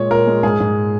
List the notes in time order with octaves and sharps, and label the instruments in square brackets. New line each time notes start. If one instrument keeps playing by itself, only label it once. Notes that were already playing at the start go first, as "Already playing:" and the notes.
Already playing: [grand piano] A#2 G#3 C#5
A#2 A#4
G#3
G#2 G#4
G#2